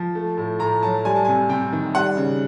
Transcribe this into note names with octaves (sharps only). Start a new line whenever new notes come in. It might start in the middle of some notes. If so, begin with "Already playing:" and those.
Already playing: F3
A3
A2
A2 A#5
F#3 A5
G3 G#5
A5
C3 G#5
C3 G5
D#3
G3 F#5
C#3